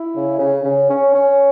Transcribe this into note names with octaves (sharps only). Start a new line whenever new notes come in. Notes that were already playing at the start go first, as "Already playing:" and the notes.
Already playing: E4
C#3
C#3
C#3
C#4
C#4